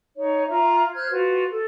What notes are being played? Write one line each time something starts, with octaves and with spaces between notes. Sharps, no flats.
D#4 C#5
F4 E5 A#5
C5 F6 F#6 G#6
F4 F#4 B4
A4